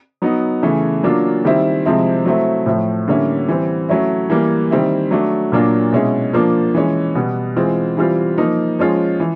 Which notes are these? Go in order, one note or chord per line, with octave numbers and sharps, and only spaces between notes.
F#3 B3 D#4
C#3 E3 A3
F#3 A#3 D4 F4
D#3 G3 C4 E4
C3 F3 G#3 C4 E4
F#3 A3 C4 E4
A2 F3 A3
D3 G3 A#3 C#4 E4
E3 G3 C4
F#3 A3 C#4 E4
E3 G3 A#3
D#3 G3 C4 E4
F#3 A3 D4
A#2 F#3 A#3 D4 F4
B2 G#3 C#4 E4
F3 A#3 D4 F4
E3 G#3 C#4
B2 G3 B3
E3 G#3 C4 F4
E3 G3 C4 F4
F3 A#3 D#4
F3 G#3 C#4 F4
E3